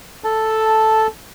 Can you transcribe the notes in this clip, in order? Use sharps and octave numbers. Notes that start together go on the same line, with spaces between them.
A4 A5